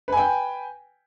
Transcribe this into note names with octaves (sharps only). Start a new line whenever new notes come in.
B4 G5 G#5